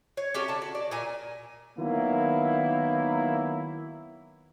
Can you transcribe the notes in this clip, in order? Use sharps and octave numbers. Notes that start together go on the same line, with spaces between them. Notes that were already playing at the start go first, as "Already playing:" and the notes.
C#5
A3 C#4 F#4 G4
D3 A5
F#4
D5
A#2 G#5
D#3 F#3 A#3 B3 E4